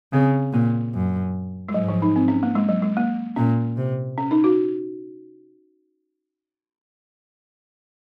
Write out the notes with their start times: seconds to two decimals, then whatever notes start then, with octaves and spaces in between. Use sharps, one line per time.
0.13 C#3 C4
0.53 A#2 A#3
0.94 F#2
1.68 G#3
1.74 G#2 F#3
1.88 F3
2.02 D#4
2.16 C4
2.28 C#4
2.43 A#3
2.55 G#3
2.69 F#3
2.82 G#3
2.97 A#3
3.36 A#2 C#4
3.77 C3
4.18 C#4
4.31 D#4
4.44 F#4